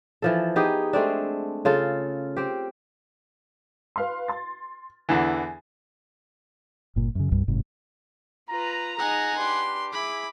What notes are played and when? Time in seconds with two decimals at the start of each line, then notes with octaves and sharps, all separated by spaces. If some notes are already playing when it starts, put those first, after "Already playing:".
0.22 E3 F3 A4
0.56 B3 D#4 G4 G#4
0.93 G#3 A3 C4 D4
1.65 C#3 F4 A4
2.37 C4 G4
3.96 B4 F5 C6
4.28 C6 A6
5.09 E2 D3 E3 G#5
6.96 G1 A#2
7.15 F#2 C#3
7.32 C2 G2 G3
7.48 F#1 G#2 C3
8.49 F4 B4 A#5
8.98 D#4 G#4 F#5 G#5
9.37 D4 G4 B4 C6
9.93 E4 G#4 B5 D6